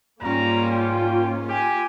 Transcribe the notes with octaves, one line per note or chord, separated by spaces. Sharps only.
G#2 G3 A#3 C#4 F4 A#5
G5
G4 G#5